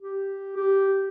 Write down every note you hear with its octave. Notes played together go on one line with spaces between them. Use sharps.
G4
G4